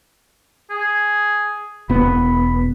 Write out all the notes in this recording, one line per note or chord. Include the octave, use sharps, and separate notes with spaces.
G#4
E1 B3 B5